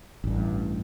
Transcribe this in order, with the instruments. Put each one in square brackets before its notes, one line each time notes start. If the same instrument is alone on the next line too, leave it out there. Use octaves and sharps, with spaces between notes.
[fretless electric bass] A1 G2